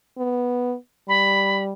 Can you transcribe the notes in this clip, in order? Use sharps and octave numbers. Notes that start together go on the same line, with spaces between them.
B3
G3 B5